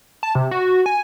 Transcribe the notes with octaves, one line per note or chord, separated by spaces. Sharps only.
A5
C3
F#4
G#5